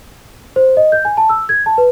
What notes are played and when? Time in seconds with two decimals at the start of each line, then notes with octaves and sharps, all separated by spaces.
0.56 C5
0.77 D#5
0.92 G6
1.05 G#5
1.17 A5
1.29 E6
1.49 G#6
1.66 A5
1.78 B4